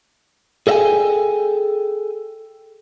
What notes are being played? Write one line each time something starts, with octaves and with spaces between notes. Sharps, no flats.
G#4 A4 D#5 E5 G5 G#5